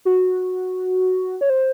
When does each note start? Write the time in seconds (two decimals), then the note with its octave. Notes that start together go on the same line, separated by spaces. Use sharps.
0.05 F#4
1.41 C#5
1.50 C5